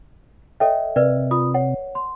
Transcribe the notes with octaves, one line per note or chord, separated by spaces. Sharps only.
A4 C#5 D#5 E5 G5
C3 A#4 B4 D5
F4 B5 D#6
C#5 F#5
C6